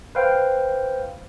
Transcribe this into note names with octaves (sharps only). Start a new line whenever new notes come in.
B4 C5 F5 G5